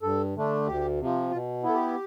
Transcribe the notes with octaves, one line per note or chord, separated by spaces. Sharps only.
G2 A4
D3 A3 D4
D2 G4
C3 F3
B2 F4
B3 E4
A4
G4